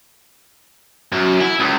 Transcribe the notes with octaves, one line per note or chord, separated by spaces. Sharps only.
F#2
E4
C#2